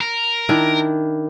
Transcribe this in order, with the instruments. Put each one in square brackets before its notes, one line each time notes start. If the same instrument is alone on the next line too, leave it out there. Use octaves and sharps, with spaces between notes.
[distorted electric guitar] A#4
[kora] D#3 D4 E4